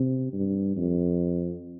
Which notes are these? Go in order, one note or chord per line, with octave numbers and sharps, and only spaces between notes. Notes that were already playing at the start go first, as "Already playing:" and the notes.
Already playing: C3
G2
F2